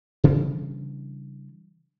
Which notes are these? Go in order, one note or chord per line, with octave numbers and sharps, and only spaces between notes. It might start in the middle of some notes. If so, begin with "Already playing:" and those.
C#3 E3 G3 D4